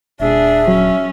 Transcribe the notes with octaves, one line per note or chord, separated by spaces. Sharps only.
D#1 D4 G#4 E5
F#3 C#4